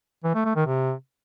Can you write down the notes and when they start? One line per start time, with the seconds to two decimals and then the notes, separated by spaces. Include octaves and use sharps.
0.24 E3
0.34 A3
0.45 A3
0.55 D#3
0.66 C3